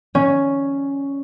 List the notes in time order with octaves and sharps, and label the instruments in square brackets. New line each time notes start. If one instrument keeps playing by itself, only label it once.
[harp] C#4